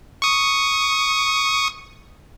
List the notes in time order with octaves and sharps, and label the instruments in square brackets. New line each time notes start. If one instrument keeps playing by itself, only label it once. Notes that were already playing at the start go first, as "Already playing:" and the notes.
[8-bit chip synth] C#6 D#6